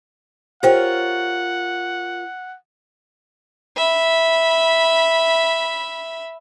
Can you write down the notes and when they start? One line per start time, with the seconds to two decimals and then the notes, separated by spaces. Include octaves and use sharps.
0.63 F4 G4 A#4 C5 C#5 F#5 G5
3.77 E5 B5